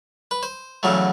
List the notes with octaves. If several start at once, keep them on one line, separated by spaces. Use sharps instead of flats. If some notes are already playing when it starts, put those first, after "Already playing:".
B4
C5
E2 C#3 F#3 A3